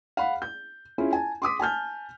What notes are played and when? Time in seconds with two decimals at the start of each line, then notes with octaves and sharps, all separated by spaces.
0.17 F5 F#5 B5
0.42 G6
0.98 C#4 E4 F4 G#4
1.13 G#5 A5
1.42 C6 D6 D#6 B6
1.59 G#5 A5 F6 G6